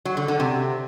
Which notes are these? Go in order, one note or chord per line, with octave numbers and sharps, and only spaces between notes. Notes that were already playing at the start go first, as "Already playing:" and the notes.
F#3
D3
D3
C3